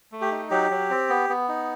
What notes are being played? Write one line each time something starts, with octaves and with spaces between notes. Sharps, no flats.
A3
G4
D#4
F#3 G4
F#3
C4
B3
B3
D#4